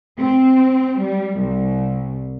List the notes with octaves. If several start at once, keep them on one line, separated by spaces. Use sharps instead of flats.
C4
G3
C2